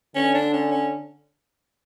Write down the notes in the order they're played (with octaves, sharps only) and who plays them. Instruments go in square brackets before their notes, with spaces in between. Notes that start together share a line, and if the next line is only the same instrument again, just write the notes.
[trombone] D3 [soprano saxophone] C#4
[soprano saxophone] D4
C#4
C#4